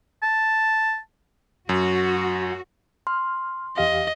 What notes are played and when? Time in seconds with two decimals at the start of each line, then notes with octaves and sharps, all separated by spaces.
0.23 A5
1.69 F#2 F#4
3.07 C6 F6
3.77 E2 G4 D#5 F5